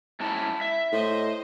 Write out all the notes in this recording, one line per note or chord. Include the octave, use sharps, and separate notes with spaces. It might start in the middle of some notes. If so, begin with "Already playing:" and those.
G#2 C#4 E4 A5
E5
A2 C5 D#5